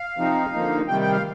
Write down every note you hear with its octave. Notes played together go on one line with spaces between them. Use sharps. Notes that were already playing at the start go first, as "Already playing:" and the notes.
Already playing: F5
C3 F3 C4 D#4
D3 F3 A#3 D#4
C3 D#3 G3 G5
G5
F5